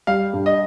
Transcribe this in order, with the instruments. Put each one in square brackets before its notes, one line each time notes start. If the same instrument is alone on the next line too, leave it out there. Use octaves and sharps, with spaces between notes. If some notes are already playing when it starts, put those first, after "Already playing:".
[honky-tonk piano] G3 [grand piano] F5
[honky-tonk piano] G2
[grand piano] D#5